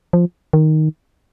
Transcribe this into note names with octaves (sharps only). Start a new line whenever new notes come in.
F3
D#3